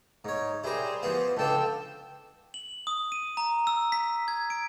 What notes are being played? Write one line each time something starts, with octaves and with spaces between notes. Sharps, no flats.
G#2 D#4 C#5
G3 E4 G#4 A#4 C5
E3 F3 B3 F4
C#2 D4 F4 A4 G5 E6
F#7
D#6
D#7
A#5
E6
B6
G#6
D7